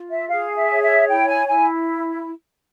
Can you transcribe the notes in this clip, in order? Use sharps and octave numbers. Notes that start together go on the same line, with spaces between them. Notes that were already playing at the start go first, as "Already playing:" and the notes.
Already playing: F4
E5
G#4 F5
E5
C#5
E5
E4 G5
G#5
E4 G#5